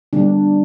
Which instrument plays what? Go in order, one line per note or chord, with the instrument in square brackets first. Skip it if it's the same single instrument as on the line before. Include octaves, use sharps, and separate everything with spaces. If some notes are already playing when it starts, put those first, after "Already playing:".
[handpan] D3 G3 B3 D4